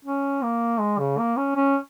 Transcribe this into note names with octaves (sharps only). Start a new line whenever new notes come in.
C#4
A#3
G#3
C#3
A#3
C#4
C#4